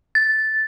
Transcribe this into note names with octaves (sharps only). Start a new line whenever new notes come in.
A6